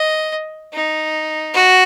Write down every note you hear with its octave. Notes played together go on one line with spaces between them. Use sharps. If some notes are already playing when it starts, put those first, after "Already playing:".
Already playing: D#5
D#4
F#4